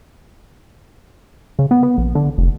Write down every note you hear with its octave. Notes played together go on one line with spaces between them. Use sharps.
C#3
B3
B3
A#1
D3
F1